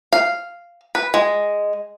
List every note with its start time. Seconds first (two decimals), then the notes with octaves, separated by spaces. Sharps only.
0.13 F5
0.95 B4
1.14 G#3